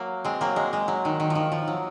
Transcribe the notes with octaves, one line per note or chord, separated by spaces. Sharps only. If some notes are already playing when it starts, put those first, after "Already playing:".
Already playing: F#3 A#3
G#3 C4
F#3 A#3
G#3
G#3
F#3
D#3
D#3
F3
D#3
F3
F#3